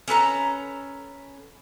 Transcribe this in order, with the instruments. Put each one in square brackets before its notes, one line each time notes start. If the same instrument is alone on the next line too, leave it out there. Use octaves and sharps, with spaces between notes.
[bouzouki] C#4 A4 B4 A#5